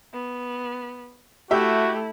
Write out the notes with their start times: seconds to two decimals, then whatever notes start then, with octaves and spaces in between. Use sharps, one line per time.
0.13 B3
1.51 A3 E4 F#4 G4 E5